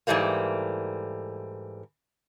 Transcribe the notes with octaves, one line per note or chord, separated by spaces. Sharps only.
G#2 E3 G3 A3 A#3